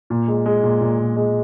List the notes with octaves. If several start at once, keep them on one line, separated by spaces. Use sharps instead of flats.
A#2
G#3
G#3
A#2
A#2
A#2
G#3